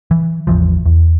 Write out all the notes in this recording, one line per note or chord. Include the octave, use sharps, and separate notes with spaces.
E3
A1 E2 E3 F3
E2